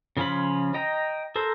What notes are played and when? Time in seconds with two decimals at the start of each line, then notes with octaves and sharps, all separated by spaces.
0.17 C#3 F3 C#4 F4 B5
0.74 D#5 G5 A#5
1.36 A4 A#4 C5